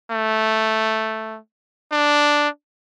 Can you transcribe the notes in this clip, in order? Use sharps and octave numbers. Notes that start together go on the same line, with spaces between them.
A3
D4